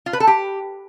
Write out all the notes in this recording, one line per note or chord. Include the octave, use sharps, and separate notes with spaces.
F4
B4
A4
G4